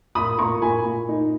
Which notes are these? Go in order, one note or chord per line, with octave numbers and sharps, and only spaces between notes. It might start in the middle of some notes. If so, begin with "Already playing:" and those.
A#2 B5 D#6
A#2 A#5 C#6
A#2 G#5 B5
A#2
D#4